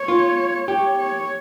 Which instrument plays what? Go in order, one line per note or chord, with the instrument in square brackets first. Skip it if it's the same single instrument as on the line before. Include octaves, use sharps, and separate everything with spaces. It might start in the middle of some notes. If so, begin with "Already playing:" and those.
Already playing: [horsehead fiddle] C#5
[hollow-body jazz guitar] F4
[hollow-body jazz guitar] G4 [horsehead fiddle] C#5
[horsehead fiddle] C#5